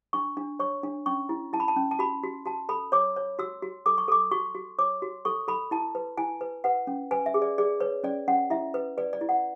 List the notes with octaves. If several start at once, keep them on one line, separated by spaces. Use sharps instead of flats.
D4 C#6
D4
C#5 C#6
D4
C#4 C#6
E4
E4 A5
B5
A5
C#4
A5
F#4 B5
F#4
F#4 A5
A4 B5
C#5 D6
C#5
F#4 E6
F#4
A4 D6
C#6
A4 D6
F#4 C#6
F#4
C#5 D6
F#4
A4 C#6
A4 B5
E4 A5
B4
E4 G#5
B4
B4 F#5
C#4
B4 G#5
E5
G#4
D5
G#4 D5
B4 C#5
C#4 D5
C#4 F#5
E4 E5
B4
B4 D5
D5
E4
F#5